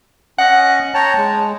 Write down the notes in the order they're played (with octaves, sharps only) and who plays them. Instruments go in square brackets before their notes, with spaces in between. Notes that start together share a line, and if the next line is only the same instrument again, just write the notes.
[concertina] C#4 D#5 [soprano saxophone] F#5
[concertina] C#5 G5 A#5 [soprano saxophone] A5
[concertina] G#3